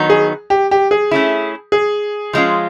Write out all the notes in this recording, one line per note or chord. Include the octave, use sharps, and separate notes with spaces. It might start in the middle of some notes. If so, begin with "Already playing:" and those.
Already playing: D#3 F#3 B3 D#4
G#4
G4
G4
G#4
A3 C#4 E4
G#4
F3 G#3 C#4 F4